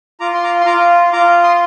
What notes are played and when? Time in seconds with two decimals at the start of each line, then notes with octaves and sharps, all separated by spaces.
0.20 F4 A#5 D6
0.34 C6
0.43 A#5 D6
0.61 C6
0.66 F4 A#5 D6
1.13 F4 A#5 D6
1.43 C6 D#6